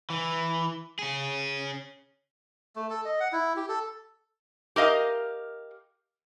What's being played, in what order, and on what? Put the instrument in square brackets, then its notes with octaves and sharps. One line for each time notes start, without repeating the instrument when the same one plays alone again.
[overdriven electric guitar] E3
C#4 G#4
[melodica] A3
A4
D#5
F#5
E4
G4
A4
[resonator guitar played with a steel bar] G4 A#4 D#5 F5